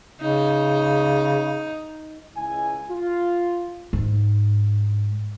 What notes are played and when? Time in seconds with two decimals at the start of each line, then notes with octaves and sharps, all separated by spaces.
0.21 C#3 D#4
2.36 C#2 E4 G#5
2.89 F4
3.93 G#2